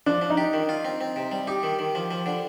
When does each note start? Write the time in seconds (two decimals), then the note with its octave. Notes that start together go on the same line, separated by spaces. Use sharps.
0.06 F3 D4
0.22 F3
0.30 D#4
0.37 G4
0.53 D#3
0.69 F4
0.85 C4
1.01 C4
1.16 C3
1.32 G3
1.47 D#4 G4
1.63 D#3
1.79 D#3
1.95 F3
2.11 F3
2.26 D3